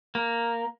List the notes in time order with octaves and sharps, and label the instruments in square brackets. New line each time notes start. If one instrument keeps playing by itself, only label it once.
[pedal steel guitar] A#3